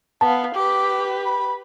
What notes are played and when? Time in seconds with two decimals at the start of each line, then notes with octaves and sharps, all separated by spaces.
0.21 B3 F5 A5
0.55 G4 B4 D6
1.25 B5